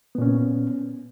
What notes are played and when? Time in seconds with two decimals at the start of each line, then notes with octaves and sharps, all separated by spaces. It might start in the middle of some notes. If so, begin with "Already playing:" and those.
0.15 B3
0.18 A#2
0.22 C#4